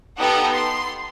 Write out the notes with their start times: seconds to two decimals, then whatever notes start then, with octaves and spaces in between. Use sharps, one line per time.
0.19 B3 D#4 G4 A4 F#5
0.51 C6